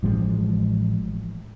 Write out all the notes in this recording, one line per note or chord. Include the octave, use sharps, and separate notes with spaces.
A1 F3 G3 G#3